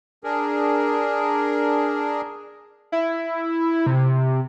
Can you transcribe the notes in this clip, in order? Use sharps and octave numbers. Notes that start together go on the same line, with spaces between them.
D4 G#4 A#4
E4
C3